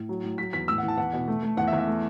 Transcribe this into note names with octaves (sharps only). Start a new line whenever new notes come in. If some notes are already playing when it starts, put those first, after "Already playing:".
Already playing: A2
F#3
A2
F#3 B6
E2 B6
A2 E6
F#5
E3
A5
E2 F#5
B2
A3
A3
E2 F#5
E5
E2
E5
A3